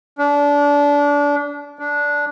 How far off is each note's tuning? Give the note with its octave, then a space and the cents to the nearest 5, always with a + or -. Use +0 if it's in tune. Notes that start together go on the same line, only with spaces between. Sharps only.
D4 -25
D4 -10